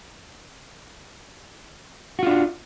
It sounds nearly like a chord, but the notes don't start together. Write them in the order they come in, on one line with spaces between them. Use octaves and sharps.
F#4 F4 D4